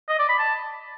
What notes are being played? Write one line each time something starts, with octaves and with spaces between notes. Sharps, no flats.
D#5
D5
B5
A5